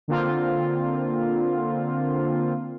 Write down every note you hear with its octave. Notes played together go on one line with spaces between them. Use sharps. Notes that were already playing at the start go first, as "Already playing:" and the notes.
D3 A#3 C4 F4